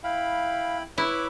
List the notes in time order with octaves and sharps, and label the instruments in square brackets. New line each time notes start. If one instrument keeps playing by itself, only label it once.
[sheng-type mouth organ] E4 G5 B5 [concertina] F5
[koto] E4 [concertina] B4 [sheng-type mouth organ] C#5 B5 D6